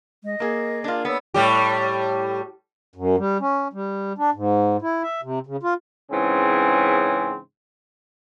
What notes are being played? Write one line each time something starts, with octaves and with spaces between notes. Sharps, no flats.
G#3 D#5
A#3 G#4 A#4
D4 F4 A#4
B3 C#5 E6
A2 G3 G4
F#2
G3
C#4
G3
D4
G#2
E4
E5
C3
C#3
F4
G#2 C#3 E3 C4 C#4